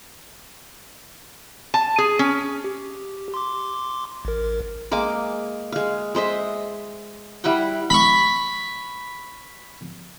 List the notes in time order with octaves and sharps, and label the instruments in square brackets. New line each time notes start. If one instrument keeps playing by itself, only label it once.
[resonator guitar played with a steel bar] A5
G#4
C#4
[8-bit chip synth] G4
C6 D6
A1 A#4
[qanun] G#3 A#3 G#5 D6
G#3 F5
G#3 C5 D#5 E5
G3 E4 F#5 G5
[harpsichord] B5 C#6